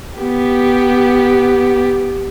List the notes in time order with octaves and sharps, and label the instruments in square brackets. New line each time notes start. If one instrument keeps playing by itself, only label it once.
[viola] B3 G4